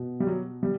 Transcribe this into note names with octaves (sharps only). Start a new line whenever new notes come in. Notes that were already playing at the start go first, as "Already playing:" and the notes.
Already playing: B2
G3
F#3
G3